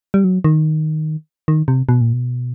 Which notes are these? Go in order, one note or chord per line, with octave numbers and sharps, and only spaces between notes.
G3
F#3
D#3
D#3
C3
B2
A#2
B2